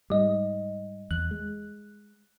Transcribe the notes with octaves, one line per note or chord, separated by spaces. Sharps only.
G#2 G3 D#5
E2 F#6
G#3